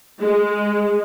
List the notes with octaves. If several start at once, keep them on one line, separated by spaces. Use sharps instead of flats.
G#3